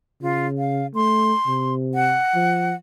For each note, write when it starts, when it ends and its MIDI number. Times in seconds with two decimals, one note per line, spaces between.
0.22 0.88 49
0.22 0.47 65
0.58 0.87 77
0.95 1.33 57
0.95 1.74 84
1.47 2.20 48
1.94 2.75 78
2.35 2.74 53